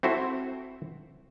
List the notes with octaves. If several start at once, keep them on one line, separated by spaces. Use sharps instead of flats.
C4 E4 F#4 A4 C5